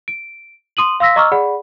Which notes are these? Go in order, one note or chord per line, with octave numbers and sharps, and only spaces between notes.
D7
C6 D#6 D#7 F#7
F5 C6 E6 A#6 B6
D#5 A#5 C#6 D6 E6 F6
G#4 D5 F#5 B5